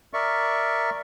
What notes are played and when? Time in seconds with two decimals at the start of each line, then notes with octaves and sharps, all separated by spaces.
0.14 A#4 D5 E5 C#6